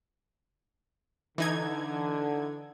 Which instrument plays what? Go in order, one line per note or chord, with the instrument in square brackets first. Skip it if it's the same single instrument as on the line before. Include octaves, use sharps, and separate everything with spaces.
[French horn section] D3 [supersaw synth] E3 D#4 G#6